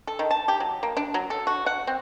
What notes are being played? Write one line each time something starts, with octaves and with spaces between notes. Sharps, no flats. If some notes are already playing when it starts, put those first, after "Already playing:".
A4
D#3
A5
G4
F#3
A#3
D4
F#3
A4
F#4
F#5
C4